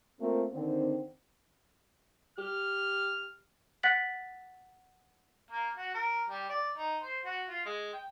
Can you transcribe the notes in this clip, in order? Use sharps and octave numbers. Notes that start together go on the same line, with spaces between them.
A3 A#3 C4 F4 A#4
D3 D#3 C4
G4 F6
F#5 F#6 A6 B6 F#7
A#3
F#4
A#4
G3
D5
D#4
C5
F#4
F4
G#3
G5